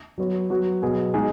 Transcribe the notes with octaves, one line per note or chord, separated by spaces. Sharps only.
F#3 B3 F#4 C#5
F#3 B3 F#4
B2 F#3 B3 G#4
B2 G#3 D#4 G#4